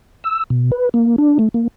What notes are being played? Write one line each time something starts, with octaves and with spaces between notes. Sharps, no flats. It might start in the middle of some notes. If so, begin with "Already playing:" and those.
E6
B2
B4
A#3
D4
A3
A#3